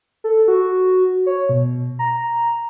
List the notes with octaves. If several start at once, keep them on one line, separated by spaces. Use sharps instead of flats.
A4
F#4
C#5
B2
A#5